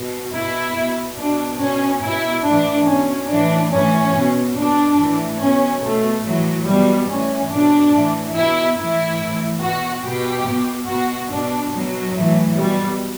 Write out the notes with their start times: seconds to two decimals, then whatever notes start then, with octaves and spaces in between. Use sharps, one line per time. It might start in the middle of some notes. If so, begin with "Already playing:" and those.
Already playing: B2
0.34 B2 E4
0.76 B2
1.18 B2 D4
1.60 B2 C#4
2.03 B2 E4
2.45 A2 E3 D4
2.86 B2 C#4
3.29 A2 E3 D4
3.71 A2 E3 C#4
4.13 B2
4.55 B2 D4
4.98 A2 E3
5.40 B2 C#4
5.82 B2 A3
6.24 A2 E3 F#3
6.66 B2 G3
7.08 A2 E3 C#4
7.51 B2 D4
7.93 A2 E3
8.35 B2 E4
8.78 A2 E3 E4
9.19 A2 E3
9.61 B2 F#4
10.03 B2 G4
10.46 B2
10.88 B2 F#4
11.30 B2 D4
11.72 B2 F#3
12.14 A2 E3
12.56 B2 G3